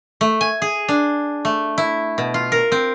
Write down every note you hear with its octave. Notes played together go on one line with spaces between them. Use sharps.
A3
G#5
G#4
D4
A3
E4
B2
F4
A#4
C4